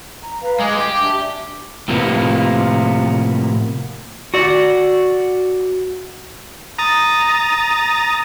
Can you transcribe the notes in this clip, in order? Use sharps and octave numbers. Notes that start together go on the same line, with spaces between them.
A#5
B4 F5 A#5
G#3 D6
G4
D4 E5
A2 C3 F3 A#3 B3
F#4 D5
A#5 D#6 A6